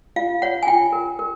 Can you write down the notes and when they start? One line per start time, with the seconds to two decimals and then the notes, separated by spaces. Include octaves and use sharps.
0.16 F4 F5
0.42 C#5 F#5
0.63 G#5
0.67 F4 G5
0.92 A#4
1.19 A#4